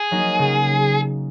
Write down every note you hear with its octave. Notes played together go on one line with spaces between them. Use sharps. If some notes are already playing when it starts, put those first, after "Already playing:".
Already playing: G#4
F#3 A#3 D#4
C#3